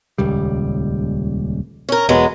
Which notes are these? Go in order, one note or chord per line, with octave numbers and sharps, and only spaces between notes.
D#1 C#2 G3
C#4 A#4
E1 F#3 G#3 B3